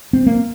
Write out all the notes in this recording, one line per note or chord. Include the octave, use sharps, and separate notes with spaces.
C4
A#3